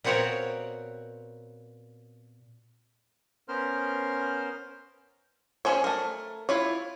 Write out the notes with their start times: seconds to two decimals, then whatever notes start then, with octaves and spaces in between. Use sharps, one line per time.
0.04 A#2 B3 C4 F#4 A#4 C#5
3.48 B3 C#4 A#4 C5 C6 F6
5.65 C#4 D4 G#4 C5 C#5
5.84 A3 A#4
6.49 E4 F4 C#5